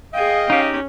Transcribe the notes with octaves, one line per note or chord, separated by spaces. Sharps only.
G#4 D#5 F5 G5
C#4 D#4 G4